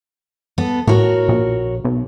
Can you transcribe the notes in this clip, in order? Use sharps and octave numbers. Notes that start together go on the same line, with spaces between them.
B3 A4
A2 F#4 A#4 C#5
A#1
B1